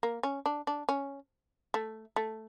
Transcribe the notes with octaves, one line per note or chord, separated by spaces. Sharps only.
A#3
C#4
D4
D4
C#4
A3
A3